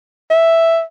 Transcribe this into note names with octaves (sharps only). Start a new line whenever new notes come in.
E5